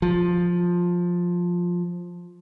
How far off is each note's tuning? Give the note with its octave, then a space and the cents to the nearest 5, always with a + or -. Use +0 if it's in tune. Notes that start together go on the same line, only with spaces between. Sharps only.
F3 +10